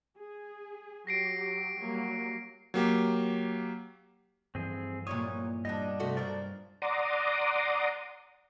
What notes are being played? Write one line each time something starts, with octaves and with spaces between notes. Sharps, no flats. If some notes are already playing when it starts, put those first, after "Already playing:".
G#4
F#3 G4 A#6 C7 D7
F#3 G3 A#3
F#3 A#3 G4
G2 E3 F3 C4 G#4
E2 A#2 F#3 G3 C#5 D#6
G2 G3 B3 D4 D#5
C3 A3 F#4
A#2 F3 F#3 A#4 D5
D5 F#5 A#5 C6 D6 D#6